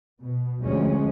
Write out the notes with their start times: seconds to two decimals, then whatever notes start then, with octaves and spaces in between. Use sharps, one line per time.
0.22 B2
0.60 D2 F3 G#3 C#4